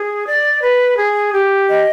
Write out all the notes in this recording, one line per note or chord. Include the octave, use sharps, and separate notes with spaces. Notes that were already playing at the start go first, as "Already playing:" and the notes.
Already playing: G#4
D5
B4
G#4
G4
D#5